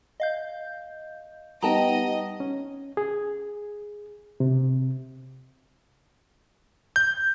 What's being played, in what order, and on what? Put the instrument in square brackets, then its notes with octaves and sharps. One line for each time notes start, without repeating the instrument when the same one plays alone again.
[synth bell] D#5 F5 G6
[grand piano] G3 B3 [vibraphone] D#4 F#5 [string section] D#5 [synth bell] G5 A5 A#5
[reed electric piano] C#4
G#4
C3
[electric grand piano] G6